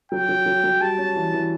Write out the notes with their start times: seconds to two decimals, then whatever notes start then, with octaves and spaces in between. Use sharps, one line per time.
0.12 F#3 G5
0.29 F#3
0.46 F#3
0.64 F#3
0.81 G3 A5
0.98 C#4
1.16 E3
1.33 E3